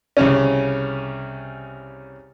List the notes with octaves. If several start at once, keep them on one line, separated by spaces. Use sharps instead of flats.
C2 C#3 C#4